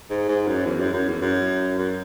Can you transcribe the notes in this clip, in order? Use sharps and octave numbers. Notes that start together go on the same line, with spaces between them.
G#2
G#2
F#2
E2
F#2
F#2
E2
F#2
F#2